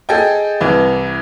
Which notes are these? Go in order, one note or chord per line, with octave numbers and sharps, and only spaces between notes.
G#4 A4 D#5 G5
C2 E3